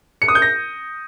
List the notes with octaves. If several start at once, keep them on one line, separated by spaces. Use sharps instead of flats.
C#7
D#6
G6
A#6